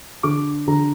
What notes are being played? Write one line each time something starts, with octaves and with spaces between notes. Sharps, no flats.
D3 D6
D3 A#5